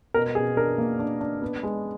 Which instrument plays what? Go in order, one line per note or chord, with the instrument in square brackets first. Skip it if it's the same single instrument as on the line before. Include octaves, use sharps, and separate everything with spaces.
[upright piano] B2 A#4
B2 G#4
D4 A#4
A#3
D4
D4
B3
G#3